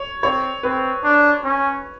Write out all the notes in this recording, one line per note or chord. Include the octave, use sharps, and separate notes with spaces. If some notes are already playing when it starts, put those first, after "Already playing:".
Already playing: C#5
C4 C#5
C4 B4
D4
C#4